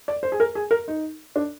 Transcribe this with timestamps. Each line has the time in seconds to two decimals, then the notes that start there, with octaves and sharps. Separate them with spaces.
0.08 D5
0.23 C5
0.32 G#4
0.40 A#4
0.55 G#4
0.71 A#4
0.88 D#4
1.36 D4